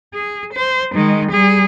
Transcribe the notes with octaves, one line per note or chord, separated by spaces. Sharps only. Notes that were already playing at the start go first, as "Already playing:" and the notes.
G#4
C5
D#3 G#3
G3 G#4